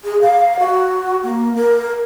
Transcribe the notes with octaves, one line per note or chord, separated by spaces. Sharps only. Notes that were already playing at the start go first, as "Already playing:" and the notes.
G#4
F5
F#4
A#3
A#4